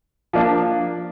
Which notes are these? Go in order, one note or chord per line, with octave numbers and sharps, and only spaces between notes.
F3 A#3 D4